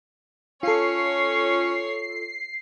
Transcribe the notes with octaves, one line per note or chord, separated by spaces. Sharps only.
C#4 F4 A4 C#5 C7